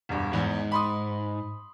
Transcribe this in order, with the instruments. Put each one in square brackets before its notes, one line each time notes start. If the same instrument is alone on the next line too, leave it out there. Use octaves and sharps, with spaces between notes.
[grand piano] E1 G2
[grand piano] E2 [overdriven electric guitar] G#2
[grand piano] B5 C6 D#6